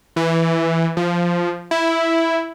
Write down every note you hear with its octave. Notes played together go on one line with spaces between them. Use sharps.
E3
F3
E4